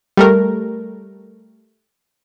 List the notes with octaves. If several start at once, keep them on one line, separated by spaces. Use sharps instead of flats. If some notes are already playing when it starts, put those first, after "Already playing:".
G3 A3 A#4